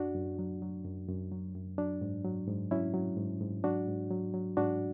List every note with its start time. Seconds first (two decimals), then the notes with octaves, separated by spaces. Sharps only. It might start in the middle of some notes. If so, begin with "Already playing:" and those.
Already playing: F#2 D4 F#4
0.15 F#2
0.39 F#3
0.62 F#3
0.85 F#2
1.08 F#2
1.32 F#3
1.55 F#2
1.78 F#3 D4
2.01 G#2
2.24 F#3
2.48 G#2
2.71 F#3 C#4 E4
2.94 F#3
3.17 G#2
3.41 G#2
3.64 F#3 D4 F#4
3.87 G#2
4.10 F#3
4.34 F#3
4.57 G#2 D4 F#4